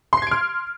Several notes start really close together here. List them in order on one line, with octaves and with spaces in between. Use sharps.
C6 C7 G#6 D7 F6